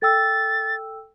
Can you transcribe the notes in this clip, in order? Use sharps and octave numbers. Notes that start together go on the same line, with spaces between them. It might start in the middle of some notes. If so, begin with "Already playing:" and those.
A4 G5 E6 A6